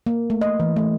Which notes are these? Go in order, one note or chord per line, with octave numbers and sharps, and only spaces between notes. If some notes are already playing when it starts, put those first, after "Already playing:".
A#3
A3
D#5
E3
A3